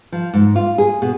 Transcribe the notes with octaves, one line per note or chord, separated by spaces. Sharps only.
F3
G#2
F4
G#4
B2